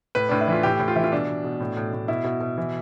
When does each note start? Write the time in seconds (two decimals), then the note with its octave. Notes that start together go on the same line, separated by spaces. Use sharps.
0.15 A2 B4
0.29 A2 D4
0.41 E4
0.48 E3 F4
0.63 A2 G4
0.79 A2
0.88 F4
0.96 E3 E4
1.04 F4
1.12 B2 D4
1.28 B2
1.44 B2
1.60 A2
1.77 A2
1.93 A2
2.08 B2 E4
2.24 B2
2.41 B2
2.58 E3